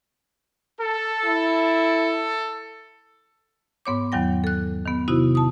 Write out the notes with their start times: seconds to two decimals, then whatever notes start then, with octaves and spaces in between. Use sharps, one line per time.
0.81 A4
1.26 E4
3.86 G#2 B3 C#5 D6
4.12 E2 D#3 F#3 G5 A#6
4.44 A4 F#6
4.85 D#3 B3
5.08 C3 D#4 E4 F#4
5.35 A5 D#6